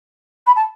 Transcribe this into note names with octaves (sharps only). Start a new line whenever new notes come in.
B5
A5